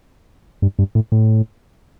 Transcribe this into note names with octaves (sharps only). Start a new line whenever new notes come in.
G2
G2
A2
A2